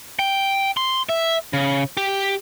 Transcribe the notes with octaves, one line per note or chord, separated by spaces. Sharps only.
G5
C6
E5
C#3
G4